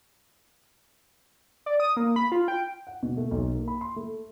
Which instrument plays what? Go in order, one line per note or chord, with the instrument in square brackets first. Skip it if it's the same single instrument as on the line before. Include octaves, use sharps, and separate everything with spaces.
[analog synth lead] D5
D#6
A#3
B5
F4
G5
[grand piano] F#5
B2
A3
B1
A#3
B5
C6
A3